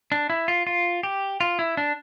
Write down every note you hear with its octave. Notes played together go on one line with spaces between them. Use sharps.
D4
E4
F4
F4
G4
F4
E4
D4